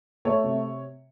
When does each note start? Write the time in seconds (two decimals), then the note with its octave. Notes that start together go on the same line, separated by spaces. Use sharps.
0.25 A3 C#5
0.44 C3